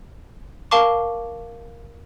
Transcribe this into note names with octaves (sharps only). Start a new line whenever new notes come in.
A#4 F5 A5 C#6 D6